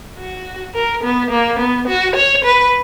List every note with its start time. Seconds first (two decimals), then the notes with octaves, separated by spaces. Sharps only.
0.18 F#4
0.75 A#4
1.03 B3
1.31 A#3
1.59 B3
1.88 F#4
2.16 C#5
2.45 B4